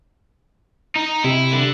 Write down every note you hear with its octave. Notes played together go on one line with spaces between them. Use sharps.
D#4
C3 E4
D3